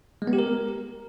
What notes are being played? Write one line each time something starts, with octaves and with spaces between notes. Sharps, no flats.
G#3
B3
G4
A#4